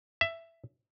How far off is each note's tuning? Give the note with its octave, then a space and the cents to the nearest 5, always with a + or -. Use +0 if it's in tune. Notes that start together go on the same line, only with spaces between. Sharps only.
E5 +10